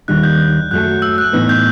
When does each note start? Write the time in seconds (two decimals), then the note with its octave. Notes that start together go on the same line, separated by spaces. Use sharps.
0.08 D#2 D#3 G3 D#4 F#6
0.23 G6
0.71 F#2 F#3 A3 F#6
1.02 E6
1.18 F#6
1.33 A2 E3 B3 D#4
1.49 G6